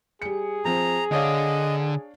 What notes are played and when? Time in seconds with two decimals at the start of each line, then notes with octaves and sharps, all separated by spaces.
0.22 G3 G#4 C#7
0.65 F3 C4 A#5
1.12 D3 D4 C#5 D#5 F5